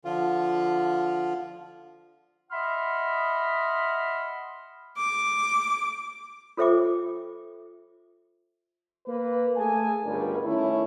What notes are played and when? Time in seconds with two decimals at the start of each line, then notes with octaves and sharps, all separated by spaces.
0.05 D3 F3 F4
2.52 D#5 E5 F#5 B5 C6 F6
4.97 D6
6.57 F4 A4 C5 E5 G5 D6
9.06 A#3 B4
9.57 A3 G#4 A4 G#5 A5
10.04 G1 C#2 G3 D4 A#4
10.45 D#3 A3 C#4 E4